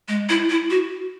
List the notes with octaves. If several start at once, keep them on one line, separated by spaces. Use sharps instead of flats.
G#3
E4
E4
F#4